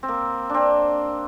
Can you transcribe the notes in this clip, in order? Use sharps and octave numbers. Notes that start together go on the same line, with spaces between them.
C4
A#3
C4 D4